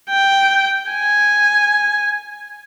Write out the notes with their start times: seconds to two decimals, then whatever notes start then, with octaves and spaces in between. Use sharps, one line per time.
0.10 G5
0.90 G#5